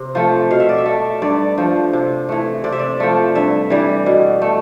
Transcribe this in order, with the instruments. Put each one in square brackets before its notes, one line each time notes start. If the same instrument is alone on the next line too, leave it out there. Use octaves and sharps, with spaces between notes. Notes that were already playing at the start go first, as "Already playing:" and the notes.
Already playing: [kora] C3
F3 A3
B2 F5
E5
D5
E5
A3
G2 D5
F3 A3
C3
E3 A3
C3 D5
E5
D5
F3 A3
G2 E5
E3 G3
B2
A3